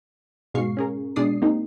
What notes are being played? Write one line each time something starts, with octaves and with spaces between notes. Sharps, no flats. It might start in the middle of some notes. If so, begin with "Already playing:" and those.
G#2 B2 G#3 F5 C#6 C7
C#4 G#4 A#4
B2 G#3 D4 D5 D#6 C7
A#3 C4 D#4 G4